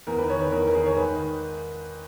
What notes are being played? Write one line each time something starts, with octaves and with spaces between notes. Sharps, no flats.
E2 A#4
D#3 B4
C#5
D#3 B4
E2 A#4
E2 A#4
G#4
D#3 C#5
G#2 B4
D#3